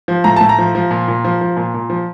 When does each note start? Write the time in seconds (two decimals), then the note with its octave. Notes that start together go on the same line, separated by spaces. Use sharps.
0.08 F3
0.24 A2 A#5
0.36 A2 A5
0.49 A#5
0.58 F3
0.75 F3
0.91 A#2
1.08 A#2
1.24 F3
1.41 F3
1.57 A#2
1.74 A#2
1.90 F3